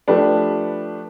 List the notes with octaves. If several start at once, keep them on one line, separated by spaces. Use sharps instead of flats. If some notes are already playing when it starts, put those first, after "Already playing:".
F3 A3 D4 G4 B4